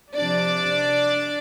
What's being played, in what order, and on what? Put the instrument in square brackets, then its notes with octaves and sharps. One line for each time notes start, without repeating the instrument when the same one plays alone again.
[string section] C3 F3 D4 D5